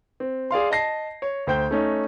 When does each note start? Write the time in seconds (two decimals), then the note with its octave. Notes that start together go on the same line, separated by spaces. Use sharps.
0.20 C4
0.51 G#4 D5 F5 C6
0.71 D#5 A5 A#6 C7
1.22 C#5
1.47 D2 C5 G5 G6
1.71 A3 C#4 D#4